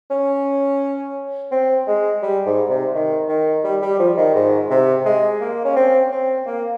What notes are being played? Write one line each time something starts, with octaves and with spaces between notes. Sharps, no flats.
C#4
C4
G#3
G3
G#2
C3
D#3
D#3
G3
G3
F3
D#3
G#2
C3
G#3
A#3
C#4
C4
C4
A#3